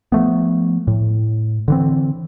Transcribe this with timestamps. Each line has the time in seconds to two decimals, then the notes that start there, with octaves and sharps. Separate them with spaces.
0.12 F3 A3 B3
0.87 A2
1.68 D3 E3 C4